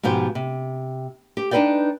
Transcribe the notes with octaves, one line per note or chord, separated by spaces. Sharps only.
G#2 B2 F3 G4 C5
C3
G4
D4 D#4 A4 B4 D5 G5